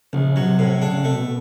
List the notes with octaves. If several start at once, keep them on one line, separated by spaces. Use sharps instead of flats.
A#1 C#3
B2 F#3
C3
A2
C#3 D4
C#3
C3 A3
B2